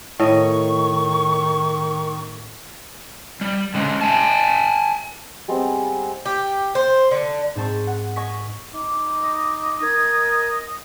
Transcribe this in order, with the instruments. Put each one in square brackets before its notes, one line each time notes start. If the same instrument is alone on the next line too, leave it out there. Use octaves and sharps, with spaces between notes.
[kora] A2 D#5 [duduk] D#3 [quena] C#6
[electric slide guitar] G3
D3 G#3 C#4
E5 G#5 A5
[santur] G3 G#3 B3 C4
[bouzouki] G4
C5
D3
[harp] G#2 C4 A5 C#6
F#5
D#5 G#5 C#6 B6
[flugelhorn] D#4 [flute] D6
[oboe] D#5
[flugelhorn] A#4 [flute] G#6